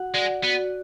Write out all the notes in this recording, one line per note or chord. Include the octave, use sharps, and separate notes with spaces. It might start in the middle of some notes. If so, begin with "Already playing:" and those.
Already playing: F#4 F#5
G#3 D5
B3 F#4